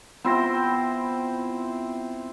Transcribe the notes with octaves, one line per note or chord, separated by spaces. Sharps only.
B3 C4 E4 F4 C5 A#6